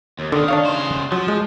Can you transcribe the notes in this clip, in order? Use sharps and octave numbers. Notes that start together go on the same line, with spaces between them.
D#2
D3 D#3
D4 C#5 F5
C#3 C5
F3 F#3
G#3